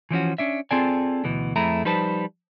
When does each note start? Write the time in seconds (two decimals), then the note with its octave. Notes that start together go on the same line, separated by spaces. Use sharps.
0.11 E3 F3 C#4 F#4
0.38 C#4 D4 E5
0.71 C4 F4 G#4 A4 D5 G#5
1.25 D2 B2 E3
1.56 F2 A3 E4 G#4 A#5
1.85 F3 G3 D#4 B4 C5 A5